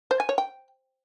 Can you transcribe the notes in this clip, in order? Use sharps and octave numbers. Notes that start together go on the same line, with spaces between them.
C5
G#5
C#5
G5